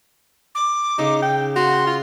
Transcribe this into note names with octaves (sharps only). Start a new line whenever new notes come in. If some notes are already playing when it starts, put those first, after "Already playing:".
D6
C#3 D#4 G#4 A4
G5
F#4 F5 C6
F4